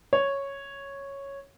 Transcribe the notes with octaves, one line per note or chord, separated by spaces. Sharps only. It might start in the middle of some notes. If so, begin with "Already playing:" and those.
C#5